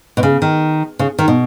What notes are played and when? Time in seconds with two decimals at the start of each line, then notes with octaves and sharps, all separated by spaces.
0.17 B2
0.23 C#3
0.42 D#3
0.99 C#3
1.19 D#3
1.28 B2